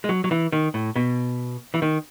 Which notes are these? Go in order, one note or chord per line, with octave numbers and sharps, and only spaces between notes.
G#3
F#3
F#3
E3
D#3
A2
B2
E3
D#3